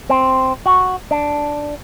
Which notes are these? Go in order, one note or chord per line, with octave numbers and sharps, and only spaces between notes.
C4
F#4
D4